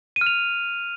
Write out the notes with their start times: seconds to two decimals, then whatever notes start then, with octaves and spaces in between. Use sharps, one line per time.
0.16 D#7
0.21 F6
0.26 F7